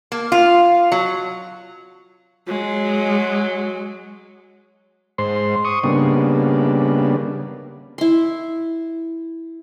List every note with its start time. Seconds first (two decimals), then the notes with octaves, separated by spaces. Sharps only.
0.12 A#3
0.32 F4
0.92 F#3
2.48 F#3 G#3
5.18 G#2 C5 C6
5.65 C#6 D#6
5.84 C#3 G3 A#3 B3 D4
7.98 E4 C6